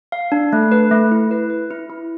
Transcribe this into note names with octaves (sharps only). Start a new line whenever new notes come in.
F5
D4
A3
B4
A3
E4
B4
B4
E4
E4